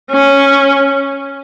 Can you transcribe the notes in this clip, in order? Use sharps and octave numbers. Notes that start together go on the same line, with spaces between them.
C#4